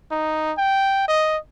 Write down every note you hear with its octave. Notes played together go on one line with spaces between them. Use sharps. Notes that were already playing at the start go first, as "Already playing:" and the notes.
D#4
G5
D#5